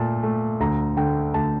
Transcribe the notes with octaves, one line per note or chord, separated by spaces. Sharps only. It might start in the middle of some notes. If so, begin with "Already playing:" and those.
Already playing: A#2 A3 A5
A3
D2 A#5
D3 A3 G5
D2 A5